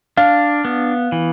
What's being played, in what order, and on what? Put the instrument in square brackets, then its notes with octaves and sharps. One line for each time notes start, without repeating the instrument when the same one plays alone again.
[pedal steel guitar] D4 [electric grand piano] F5
[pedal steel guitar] B3
E3